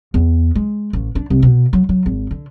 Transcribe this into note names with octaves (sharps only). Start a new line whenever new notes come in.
E2
G#3
A1
D4
C2
B2
F#3
F#3
G#1
D3